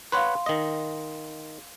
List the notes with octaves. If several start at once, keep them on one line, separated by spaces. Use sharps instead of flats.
B4 C#5 F5 F#5 C6
D#3 D#5